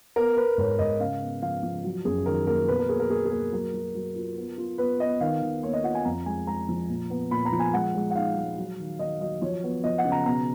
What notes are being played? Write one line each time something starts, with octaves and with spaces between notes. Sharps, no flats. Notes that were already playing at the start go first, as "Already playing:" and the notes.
B3 A#4
B3 B4
G#2 C#5
G#2 D#5
C#3 F5
B3
F3 F5
F3
F#3
F#2 G#4
D#3 A#4
A#3 A#4
B2 B4
A#4
A#3 G#4
A#4
A#3 G#4
G#4
A#3 A#4
F#3 A#4
F#3
F#3
F4
B3
F4
B3 B4
B3 D#5
D#3 F5
D#3
A#3 C#5
D#5
F4 F#5
G#5
F2 A#5
G#3 G#5
G#3 A#5
F3
A#2
B3
A#2 B5
A#5
F3
G#5
G#3 F#5
G#3
F#5
D#4 F5
G#3
F#3
D#3
D#3 D#5
F#3 D#5
F3 C#5
B3
F3 D#5
F#5
C#3
A#5
B2 A#5